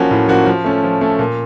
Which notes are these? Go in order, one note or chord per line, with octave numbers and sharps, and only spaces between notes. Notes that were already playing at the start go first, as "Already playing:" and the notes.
Already playing: F3 A#3 C#4 F#4
A2
F3 A#3 C#4 F#4
F3
A3 C#4
F3
A3 C#4
A#2